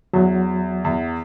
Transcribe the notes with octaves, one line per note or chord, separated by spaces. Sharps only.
E2 F#3
E2